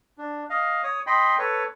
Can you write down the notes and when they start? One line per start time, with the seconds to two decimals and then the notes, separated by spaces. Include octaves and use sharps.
0.18 D4
0.50 D#5 F5
0.84 C#5 D#6
1.07 D#5 G5 B5 C6
1.39 A4 B4 C#5